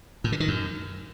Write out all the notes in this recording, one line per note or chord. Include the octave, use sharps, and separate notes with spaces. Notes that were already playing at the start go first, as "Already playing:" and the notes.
A2
D3
D#3
F#2